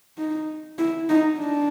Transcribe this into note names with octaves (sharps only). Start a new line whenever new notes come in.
D#4
E4
D#4
D4